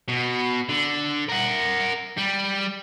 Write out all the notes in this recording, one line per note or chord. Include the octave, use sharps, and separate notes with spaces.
B2
D3
A#4 F#5
G3